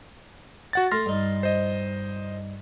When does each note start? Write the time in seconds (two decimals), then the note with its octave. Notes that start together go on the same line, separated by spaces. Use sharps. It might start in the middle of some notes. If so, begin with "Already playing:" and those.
0.73 F#4 F#5 A6
0.91 A3 C6 F6 A#6
1.06 G2 D#4
1.43 C5 D#5